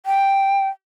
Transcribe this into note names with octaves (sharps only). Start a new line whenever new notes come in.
G5